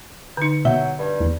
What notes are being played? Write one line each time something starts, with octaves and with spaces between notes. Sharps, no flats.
D3 D#4
B2 F#3 E5 G6
G2
E2